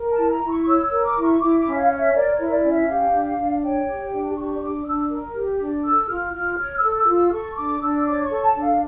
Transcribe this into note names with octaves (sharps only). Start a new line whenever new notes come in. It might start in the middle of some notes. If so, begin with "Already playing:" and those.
Already playing: A#4
A5
E4
A#5
E4
C#6
C#5 E6
E6
A#4
D6
E4
C#6
E4 D6
D6
C#4
E5
F5
C#5
E5
A#4 D5
C#5
E4
D5
C#4
E5
G4 F5
D4
D4
C#5 G5
G4
D4
G4 C#6
D4 D6
D4 E6
A#4
G4
D4
A4 E6
F4 F6
F4 F6
C#5 F6
E6
A4
E6
F4
E6
A4 C#6
D4 D6
D4 E6
C#5 D6
C#6
A4
A5
D4
F5